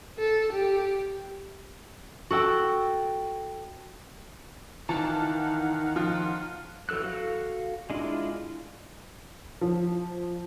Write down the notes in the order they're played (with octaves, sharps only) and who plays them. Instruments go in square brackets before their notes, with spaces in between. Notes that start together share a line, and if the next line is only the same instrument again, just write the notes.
[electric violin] A4
G4
[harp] F#4 A4 G5 E6
[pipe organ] D#3 F5 F#5 [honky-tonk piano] E3 A5 [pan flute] D#4
[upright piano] F3 F4
[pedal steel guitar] E3 F#3 A4 E6 F#6
F#4 A4 F5
G#3 D4 E4 F4
[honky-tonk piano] F3